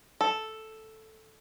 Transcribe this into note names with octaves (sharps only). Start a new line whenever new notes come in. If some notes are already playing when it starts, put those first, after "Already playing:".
A4